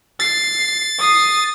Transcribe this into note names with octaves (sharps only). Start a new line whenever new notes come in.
A6 C7
D#6 C7